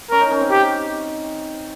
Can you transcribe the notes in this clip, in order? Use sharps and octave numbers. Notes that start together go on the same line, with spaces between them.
C#4 A#4
D#4
C#4
C4
G4